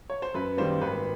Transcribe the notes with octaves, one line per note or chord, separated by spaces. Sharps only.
C#5
C5
F#2 B4
D#3 G3 A#3 C5
G#1 B4